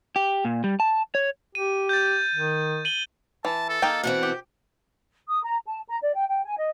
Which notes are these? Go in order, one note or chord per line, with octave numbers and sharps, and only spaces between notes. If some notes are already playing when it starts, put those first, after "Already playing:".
G4
A#2
G3
A5
C#5
G4 D#7
G6 A6
D#3
D#7 F#7 G7
E3 A5
A4
A#3 D#4 G5
B2 E3 C4 F#5
G4
D#6
A#5
A5
A#5
D5
G5
G5
G#5
D#5